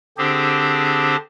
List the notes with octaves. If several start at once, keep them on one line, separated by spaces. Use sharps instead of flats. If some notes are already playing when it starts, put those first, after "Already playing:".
D3 C4 D4 G4 G#4 C5